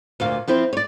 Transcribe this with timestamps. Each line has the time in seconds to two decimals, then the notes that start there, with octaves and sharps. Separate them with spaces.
0.20 D2 A#2 F5
0.48 F3 C4 E4 C5
0.73 C#5 D5